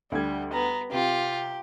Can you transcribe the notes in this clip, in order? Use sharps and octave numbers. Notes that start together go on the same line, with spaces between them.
D2 D3 G3 G#6
B3 A#5
C3 F4 G4